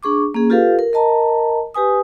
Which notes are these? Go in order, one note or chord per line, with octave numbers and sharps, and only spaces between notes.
D4 G#4 C#6 D6
A#3 C#4 G#4
F4 G4 A4 B4 F5
A#4
A#4 D#5 A5 A#5
G4 B4 G#5 D#6